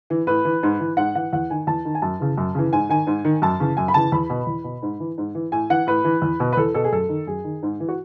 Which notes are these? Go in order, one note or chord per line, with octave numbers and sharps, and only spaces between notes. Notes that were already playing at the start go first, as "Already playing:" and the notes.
E3
A2 B4
E3
G#2
E3
G#2 F#5
E3 F#5
E2 F#5
D#3 G#5
E2 A5
D#3
G#5
F#2 A5
C#3 E3
F#2
C#3 E3
G#2 G#5
D#3 G#5
G#2
D#3
F#2 A5
C#3 E3
F#2 G#5
B5
C#3 E3 A5
E2 B5
B2
E2
B2
G#2
E3
G#2
E3
A2 G#5
E3 F#5
A2 B4
E3
E2
B2
B4
E2 A4
B2 A4
G#4
F#2 A4
D#3
F#2 G#4
D#3
G#2
E3
F#4